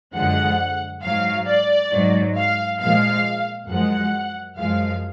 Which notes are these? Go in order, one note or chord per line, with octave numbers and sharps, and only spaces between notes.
F#2 D3 F3 G#3 F#5
G#2 F#3 F5
D5
G#2 F#3
F5
A#2 F3 G#3 F5
F#2 F3 G#3 F#5
F#2 F3 G#3 F5